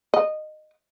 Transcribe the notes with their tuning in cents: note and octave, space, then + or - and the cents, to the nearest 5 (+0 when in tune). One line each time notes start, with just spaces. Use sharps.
D#5 -15